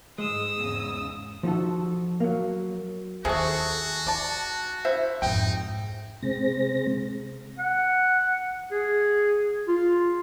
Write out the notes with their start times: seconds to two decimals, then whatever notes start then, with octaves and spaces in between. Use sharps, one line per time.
0.18 G#2 G#3 D#6 E6
0.56 E2 G#2 C#3
1.43 F3 D#4 F#4 A4
2.20 F#3 A#3
3.25 D#2 C3 F#4 G#4 A4 C#6
4.06 D#4 D5 A5
4.85 E4 C5
5.22 F2 G#2 D#4 G5
6.23 C3 G#3 C4 A#6
7.59 F#5
8.72 G#4
9.68 F4